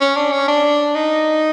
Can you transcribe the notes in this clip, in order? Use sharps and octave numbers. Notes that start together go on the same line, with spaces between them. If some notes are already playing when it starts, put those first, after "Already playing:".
C#4
D4
C#4
D4
D#4